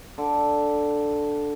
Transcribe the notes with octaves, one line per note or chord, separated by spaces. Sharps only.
D3